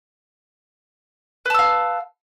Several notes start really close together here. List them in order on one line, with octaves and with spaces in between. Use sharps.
B4 A5 E6 F5